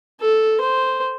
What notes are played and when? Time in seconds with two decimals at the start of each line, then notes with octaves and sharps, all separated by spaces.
0.21 A4
0.61 C5